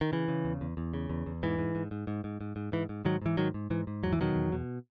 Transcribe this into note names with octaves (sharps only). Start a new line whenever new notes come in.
D#3
C#3 E3
C#3
E2
E2
E2
C#3
E2
E2
G#2 E3
G#2
G#2
G#2
G#2
G#2
G#2
G#2
G#2 E3
G#2
G#2 D#3 F#3
G#2 E3
G#2 D#3 F#3
G#2
G#2 E3
G#2
E2 F#3
E3
B2 D#3 F#3
E2
B2